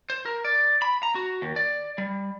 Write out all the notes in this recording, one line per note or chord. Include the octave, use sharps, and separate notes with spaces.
C5
A#4
D5
B5
A#5
F#4
D#2
D5
G3